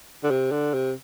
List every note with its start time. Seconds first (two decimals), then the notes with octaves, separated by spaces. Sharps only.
0.24 D3
0.30 C3
0.52 D3
0.74 C3